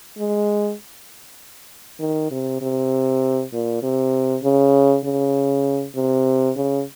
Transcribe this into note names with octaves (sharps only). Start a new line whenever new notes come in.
G#3
D#3
C3
C3
A#2
C3
C#3
C#3
C3
C#3